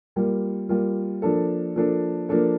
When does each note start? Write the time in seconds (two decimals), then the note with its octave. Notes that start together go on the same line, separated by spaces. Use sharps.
0.16 G3 A#3 F4
0.69 G3 A#3 F4
1.22 F3 A#3 D4 A4
1.76 F3 A#3 D4 A4
2.29 F3 A#3 D4 A4